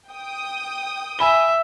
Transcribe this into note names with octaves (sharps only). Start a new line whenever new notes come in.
G5 D#6
E5 G#5 B5 G7